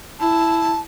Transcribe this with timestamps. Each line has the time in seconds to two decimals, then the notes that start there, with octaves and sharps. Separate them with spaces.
0.20 E4 A5